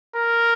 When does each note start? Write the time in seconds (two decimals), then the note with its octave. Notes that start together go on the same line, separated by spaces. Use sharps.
0.15 A#4